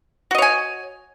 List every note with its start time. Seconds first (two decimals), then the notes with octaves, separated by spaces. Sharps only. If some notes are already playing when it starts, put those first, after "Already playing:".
0.31 F#4
0.35 D#5
0.38 C#5
0.42 G#5